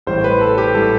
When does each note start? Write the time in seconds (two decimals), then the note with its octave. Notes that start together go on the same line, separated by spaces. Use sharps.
0.07 A1 A2 G3 C5
0.24 B4
0.41 A4
0.58 G4
0.75 A2 G3 A4